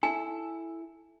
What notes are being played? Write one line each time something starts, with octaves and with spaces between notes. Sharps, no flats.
E4 A4 G#5